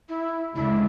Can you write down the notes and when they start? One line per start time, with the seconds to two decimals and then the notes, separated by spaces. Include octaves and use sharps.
0.09 E4
0.55 D2 C#3 G#3 D4 E4